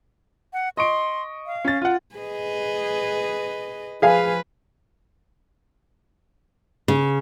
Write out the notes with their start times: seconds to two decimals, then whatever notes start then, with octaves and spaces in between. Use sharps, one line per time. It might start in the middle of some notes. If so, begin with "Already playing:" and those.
0.53 F#5
0.77 D#5 C6 C#6 D7
1.46 F5
1.65 C#4 A6
1.82 F4 F#5
2.16 G#4 B4 D#5
4.02 F3 G#4 B4 F5 G#5
6.88 C#3